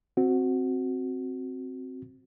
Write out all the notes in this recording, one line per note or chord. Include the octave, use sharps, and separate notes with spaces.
C4 F#4